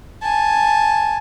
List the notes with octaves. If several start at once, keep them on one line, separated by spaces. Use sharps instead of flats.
G#5 A5